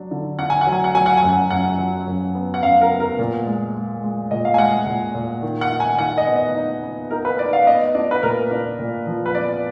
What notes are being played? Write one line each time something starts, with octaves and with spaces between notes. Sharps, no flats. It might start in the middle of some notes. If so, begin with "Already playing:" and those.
Already playing: F#3 D4
D3
D4 F#5
G#5
F#5
F#3
G#5
F#5
F#3 G#5
F#5
G#5
F#2
F#5
F#2 F#5
F#3
F#2
B3
F#5
F#2 F5
A#4
B3
A#4
A#2
G#3
G#3
G#3
A#2 D#5
F5
G#5
G#3 F#5
A#2
A#2
D#3
F#5
D#4
G#5
D#3 F#5
D#5
B3
D#5
D#4
B3
D#4 A#4
B4
D#4 D5
F5
B3 D#5
D4 D5
B4
A#2 A#4
D4
A#2
F3
B4
B3 D5